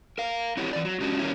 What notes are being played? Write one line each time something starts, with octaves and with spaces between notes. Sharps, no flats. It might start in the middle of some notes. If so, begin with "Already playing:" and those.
A#4 F5
C4 E4 F#4 G4 C#5
E3 D5
F#3
G#3 C#4 D4 E4 F#4 G4
D#3 G3 A#3 C#4 E4